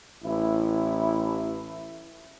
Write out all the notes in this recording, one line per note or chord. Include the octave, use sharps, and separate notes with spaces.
A1 E4